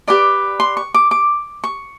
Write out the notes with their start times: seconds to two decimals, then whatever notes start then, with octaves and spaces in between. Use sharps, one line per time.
0.08 G4 B4 D5 D6
0.60 C6
0.77 C#6
0.94 D6
1.11 D6
1.64 C#6